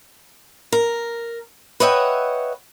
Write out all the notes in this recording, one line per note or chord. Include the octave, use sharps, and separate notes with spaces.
A#4
B4 C#5 D#5 E5 F#5 G5